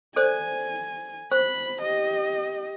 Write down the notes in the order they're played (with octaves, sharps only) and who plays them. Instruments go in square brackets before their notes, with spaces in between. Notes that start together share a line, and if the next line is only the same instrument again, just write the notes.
[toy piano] A4 C5 D5 [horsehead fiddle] G#5
[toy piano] C5 [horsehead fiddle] B5
[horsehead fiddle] G4 D#5